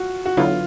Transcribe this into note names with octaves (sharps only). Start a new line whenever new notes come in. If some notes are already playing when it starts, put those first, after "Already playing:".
Already playing: F4 F#4
F#4
D3 F#3 B3 E4 F4